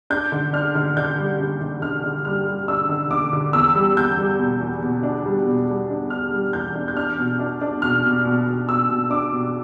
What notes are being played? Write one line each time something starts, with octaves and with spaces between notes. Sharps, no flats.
D4 G6
D3
D4 F6
D3
D3 G6
G3
D3
D3
D3 F6
D3
G3 F6
G3
D4 E6
D3
D3 D6
D3
E2 E6
G3
E2 G6
G3
B2
E2
B2
D4
G3
B2
G3
D4
D4 F6
G3
E2 G6
D4
G6
D4 F6
B2
D4
D4
B2 F6
B2
B2
B2
B2 E6
B2
D4 D6
B2